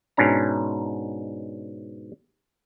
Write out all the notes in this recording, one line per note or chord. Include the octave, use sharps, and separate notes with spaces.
G#2 B2 C#4 D4 A#5